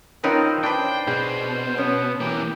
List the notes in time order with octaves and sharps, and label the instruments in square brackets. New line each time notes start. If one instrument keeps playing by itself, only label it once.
[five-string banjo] D#3 C#4 F4 [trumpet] C4 [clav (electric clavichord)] D#4 A#4 B4
[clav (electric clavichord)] D4 B4 [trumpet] C5 [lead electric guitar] G5
[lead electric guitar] B2 [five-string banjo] G#4
[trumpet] B3 [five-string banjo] C#4
[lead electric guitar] E3 A#3 [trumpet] G4